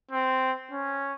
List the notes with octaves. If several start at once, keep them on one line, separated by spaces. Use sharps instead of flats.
C4
C#4